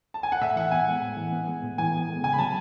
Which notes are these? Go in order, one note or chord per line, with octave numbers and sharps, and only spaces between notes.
A5
G#5
F#5
A2 E5
E3 F#5
B3 G#5
G#3
A2
E3
B3
G#3
A2
E3 G#5
B3
G#3
C#3 G#5
B5
F#3 A5